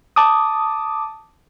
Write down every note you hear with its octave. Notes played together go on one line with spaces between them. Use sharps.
A5 D6 D#6